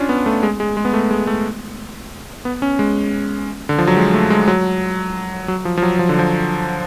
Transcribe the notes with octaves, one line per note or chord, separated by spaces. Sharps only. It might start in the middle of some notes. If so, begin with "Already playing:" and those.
Already playing: C#4 D4 F4
B3
A3
G#3
G#3
G#3
B3
A3
G#3
A3
B3
C#4
G#3
D3
F3
F#3
G#3
A3
G#3
F#3
F#3
F3
F3
F#3
F3
D3
F3